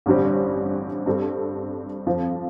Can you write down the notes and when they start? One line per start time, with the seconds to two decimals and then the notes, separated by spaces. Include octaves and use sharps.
0.06 A1 G2 D3 G3 C4
1.06 G2 G3 C4 A4
2.06 F2 F3 C4